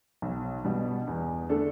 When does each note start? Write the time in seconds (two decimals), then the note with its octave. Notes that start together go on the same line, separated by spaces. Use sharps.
0.22 B1
0.65 B2 G3
1.07 E2
1.49 D3 A3 D4 A4